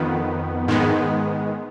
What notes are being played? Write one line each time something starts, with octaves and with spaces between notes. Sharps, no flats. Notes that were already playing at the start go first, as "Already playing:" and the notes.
Already playing: F2 D#3 B3
G#2 D#3 G#3 B3